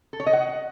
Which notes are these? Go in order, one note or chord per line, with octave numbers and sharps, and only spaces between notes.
A4
C#5
D#5
F#5